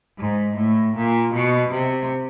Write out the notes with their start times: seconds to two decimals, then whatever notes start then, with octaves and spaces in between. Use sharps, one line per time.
0.18 G#2
0.57 A2
0.95 A#2
1.33 B2
1.72 C3